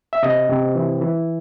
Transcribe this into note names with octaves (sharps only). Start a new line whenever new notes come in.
E5
C3 D#5
C3
E3
E3